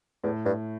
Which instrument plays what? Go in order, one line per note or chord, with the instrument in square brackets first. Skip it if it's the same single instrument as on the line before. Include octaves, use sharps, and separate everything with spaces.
[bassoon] E2 [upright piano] A2
[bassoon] G2